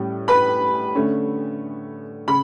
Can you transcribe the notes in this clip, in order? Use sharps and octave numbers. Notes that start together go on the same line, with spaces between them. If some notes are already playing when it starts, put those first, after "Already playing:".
Already playing: A2 G3 C#4
B4 B5
D3 A3 C#4
C#3 B5